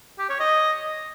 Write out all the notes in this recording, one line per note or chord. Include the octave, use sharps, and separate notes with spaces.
G4
C#5
D#5